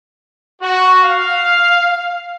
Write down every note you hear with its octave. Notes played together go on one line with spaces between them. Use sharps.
F#4
F5